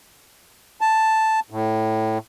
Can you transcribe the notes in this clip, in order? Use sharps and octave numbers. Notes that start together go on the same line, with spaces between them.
A5
A2